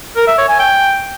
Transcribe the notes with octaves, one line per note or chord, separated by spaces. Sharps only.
A#4
E5
C#5
G#5
G5